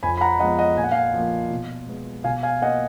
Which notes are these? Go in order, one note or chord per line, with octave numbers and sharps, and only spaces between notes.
F2 G#5 B5
B5
F#5 A#5
F3 G#3 B3 D#5 F#5
D#5 F#5
A#2 G#5
F#5
F5 G#5
F3 A#3
B2
G#3 B3
B2 F5 G#5
F5 G#5
A#3 D#5 F#5